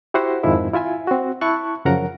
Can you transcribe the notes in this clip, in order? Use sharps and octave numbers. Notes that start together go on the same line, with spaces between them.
E4 F#4 G4 C5 F#5
F2 G#2 D#3 F3 G#3 E4
E4 F4 E5 G#5
C4 F#4
E4 A5 C#6 F#6
F#2 C#3 F3 A#4 F#5 A#5